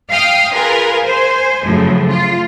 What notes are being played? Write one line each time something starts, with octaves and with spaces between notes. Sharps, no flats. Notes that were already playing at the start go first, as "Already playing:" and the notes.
F5 G5 D#6 F6
F4 G#4 A#4 B4
C5 G#5
F#2 A2 C#3 F3
F4